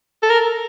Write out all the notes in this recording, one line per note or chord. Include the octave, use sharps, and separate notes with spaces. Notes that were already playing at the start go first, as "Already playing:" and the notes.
A4
A#4